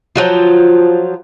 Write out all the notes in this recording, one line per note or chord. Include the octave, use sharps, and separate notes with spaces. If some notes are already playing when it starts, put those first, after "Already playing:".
F3 F#3 F4